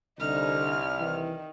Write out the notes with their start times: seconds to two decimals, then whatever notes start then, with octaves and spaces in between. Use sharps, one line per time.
0.20 C2 D3 D#4 F6
0.99 D#3 E3